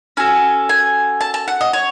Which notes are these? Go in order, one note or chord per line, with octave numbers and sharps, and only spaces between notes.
C#4 F#4 A4 G#5
G#5
A5
A5
F#5
D#5
C#5